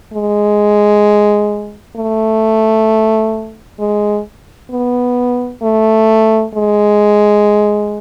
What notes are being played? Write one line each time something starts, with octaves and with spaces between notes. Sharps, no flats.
G#3
A3
G#3
B3
A3
G#3